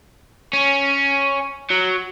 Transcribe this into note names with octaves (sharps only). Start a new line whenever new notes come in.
C#4
F#3